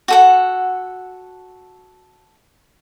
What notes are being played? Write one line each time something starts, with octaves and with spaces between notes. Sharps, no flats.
F#4 A4 F#5